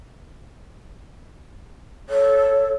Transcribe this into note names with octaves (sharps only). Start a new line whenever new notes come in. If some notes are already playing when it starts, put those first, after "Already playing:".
A4 C#5